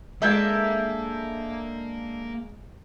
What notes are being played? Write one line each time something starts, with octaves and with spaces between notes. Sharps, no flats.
G#3 A#3 D4 A4 E5 F5 G6 G#6